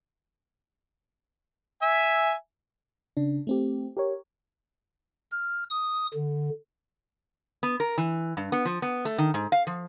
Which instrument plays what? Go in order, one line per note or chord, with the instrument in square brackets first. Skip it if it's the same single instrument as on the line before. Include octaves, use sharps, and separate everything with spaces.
[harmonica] E5 G#5
[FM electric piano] C#3 D4
A3 C4 G4
G4 A#4 C#5
[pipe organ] F6
D#6
D3
[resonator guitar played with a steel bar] B3
A#4
E3
G2
B3
F3
B3
A3
D#3
G#2
F5
F3